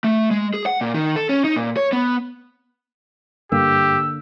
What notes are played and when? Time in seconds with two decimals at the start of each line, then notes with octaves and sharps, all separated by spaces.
0.04 A3
0.31 G#3
0.54 G#4
0.66 F#5
0.81 A#2
0.94 D#3
1.16 A4
1.29 C#4
1.44 D#4
1.56 A#2
1.77 C#5
1.92 B3
3.52 G2 D3 A#3 G4 E6